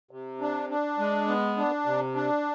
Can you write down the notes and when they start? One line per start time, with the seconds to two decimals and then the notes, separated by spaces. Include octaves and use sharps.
0.11 C3
0.41 D4
0.70 D4
0.99 G#3
1.28 B3
1.57 D4
1.86 C3
2.15 D4